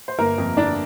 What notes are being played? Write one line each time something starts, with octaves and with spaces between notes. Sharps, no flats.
C5
G1 A#3 A#4
F2
D3 D4 D5